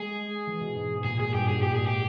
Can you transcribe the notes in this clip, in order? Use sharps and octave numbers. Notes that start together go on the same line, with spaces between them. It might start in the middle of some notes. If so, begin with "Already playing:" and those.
Already playing: G#3 G#4
E3
B2
G#2
G#2
A#2 G#4
A#2 G#4
G2 G4
G#2 G#4
A#2 G4
G#2 G#4
G4